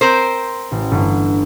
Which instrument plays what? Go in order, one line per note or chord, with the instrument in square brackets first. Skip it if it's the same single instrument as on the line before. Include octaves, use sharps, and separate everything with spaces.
[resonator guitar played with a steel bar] C4 A#4 C5
[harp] A1
G1